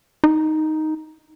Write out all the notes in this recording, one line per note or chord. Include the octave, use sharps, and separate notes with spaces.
D#4